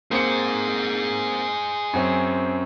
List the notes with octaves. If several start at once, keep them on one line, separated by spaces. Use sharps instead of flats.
A#3 C4 G#4 C5 C#7
F#2 C4 C#4